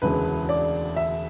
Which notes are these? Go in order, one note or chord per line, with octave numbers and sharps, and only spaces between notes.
E1 D2 C#3 E3 G#3 B4
D5
E5